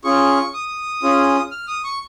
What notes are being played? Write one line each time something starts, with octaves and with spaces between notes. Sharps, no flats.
C#4 F4 G#4 C#6
D#6
C#4 F4 G#4
F6
D#6
C#6